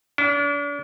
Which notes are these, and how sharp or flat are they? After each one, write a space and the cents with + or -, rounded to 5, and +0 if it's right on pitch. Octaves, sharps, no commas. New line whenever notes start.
D4 -40